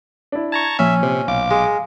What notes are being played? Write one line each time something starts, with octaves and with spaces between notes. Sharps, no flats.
D4 E4
A5 A#5 C#6 G#6
A#2 F3 C#4 E5
C3 C5
B1 F5 D6
G#3